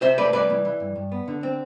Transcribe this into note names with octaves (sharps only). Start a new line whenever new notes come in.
C3 C5 E5
A3 B4 D5
C2 B4 D5
E3
E3
G2
G2
B3
D3
C4